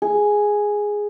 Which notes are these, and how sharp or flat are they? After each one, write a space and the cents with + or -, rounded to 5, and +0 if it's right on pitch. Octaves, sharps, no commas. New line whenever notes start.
G#4 +0